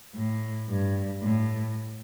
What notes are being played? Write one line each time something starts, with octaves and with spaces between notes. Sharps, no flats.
A2
G2
A2